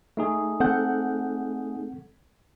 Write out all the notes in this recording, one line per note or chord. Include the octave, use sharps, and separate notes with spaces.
A3 D#4 G#4
C4 A4 F#5 G6